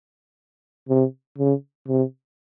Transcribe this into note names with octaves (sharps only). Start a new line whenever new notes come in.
C3
C#3
C3